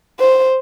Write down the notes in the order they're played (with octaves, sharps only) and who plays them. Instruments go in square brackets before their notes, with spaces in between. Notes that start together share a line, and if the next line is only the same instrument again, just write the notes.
[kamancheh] C5